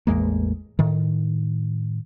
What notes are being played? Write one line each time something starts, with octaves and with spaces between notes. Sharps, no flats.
A1 E2 G#3 A#3
A2 D#3